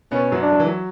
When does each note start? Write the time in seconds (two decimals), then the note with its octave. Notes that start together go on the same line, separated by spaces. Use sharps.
0.12 B2 B3 C#4
0.32 F#2 F#3
0.42 D4
0.52 F#3
0.60 E3
0.66 F#3